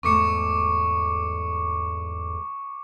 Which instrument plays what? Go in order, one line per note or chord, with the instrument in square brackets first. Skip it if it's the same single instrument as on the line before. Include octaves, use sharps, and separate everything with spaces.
[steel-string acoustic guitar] E2 G#2 A3 [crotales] C#6 D6 C#7